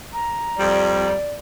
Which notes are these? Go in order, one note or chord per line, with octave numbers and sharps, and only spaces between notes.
A#5
F2 G3 D5